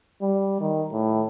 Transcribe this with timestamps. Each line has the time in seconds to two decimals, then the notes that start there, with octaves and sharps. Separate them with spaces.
0.22 G3
0.61 D#3
0.92 A2